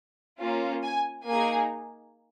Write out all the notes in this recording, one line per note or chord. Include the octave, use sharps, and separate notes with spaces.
A#3 C#4 F4
G#5
A#3 D#4 G#4 G#5